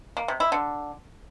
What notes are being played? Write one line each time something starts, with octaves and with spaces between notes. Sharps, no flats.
A#3
C3
E4
D3